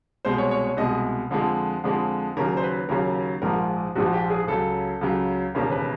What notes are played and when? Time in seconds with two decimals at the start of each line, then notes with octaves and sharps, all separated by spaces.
0.25 C2 B2 G#3 C5
0.38 C#5
0.51 C#5
0.64 C#5
0.77 C2 B2 G#3 D#5
1.31 F2 D3 F3 G#3
1.84 F2 D3 F3 G#3
2.36 D#2 C#3 F#3 A#4
2.57 C5
2.63 B4
2.89 D#2 C#3 F#3 A#4
3.42 A#1 G#2 F3 G#3 A#4
3.95 A#1 G#2 F3 G#3 F#4
4.13 G4
4.30 G#4
4.48 C#2 C#3 F#3 A4
5.01 C#2 C#3 F#3
5.55 E1 D#2 C#3 A#4
5.71 B4